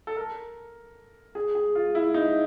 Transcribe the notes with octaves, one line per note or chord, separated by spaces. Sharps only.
A4
A#4
G#4
G#4
F4
E4
D#4